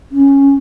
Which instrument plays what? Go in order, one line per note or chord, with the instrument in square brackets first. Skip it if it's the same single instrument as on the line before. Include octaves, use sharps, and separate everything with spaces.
[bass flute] C#4